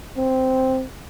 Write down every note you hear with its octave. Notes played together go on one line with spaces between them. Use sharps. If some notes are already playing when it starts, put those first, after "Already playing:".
C4